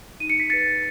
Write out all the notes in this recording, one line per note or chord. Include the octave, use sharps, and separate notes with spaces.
D#4 D#7
C#7
B6
G#4 B4 A6 C#7